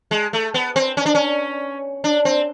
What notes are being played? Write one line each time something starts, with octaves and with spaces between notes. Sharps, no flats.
G#3
A3
B3
C4
C#4
D4
C#4
D4
C4